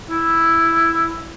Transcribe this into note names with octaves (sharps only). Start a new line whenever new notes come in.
E4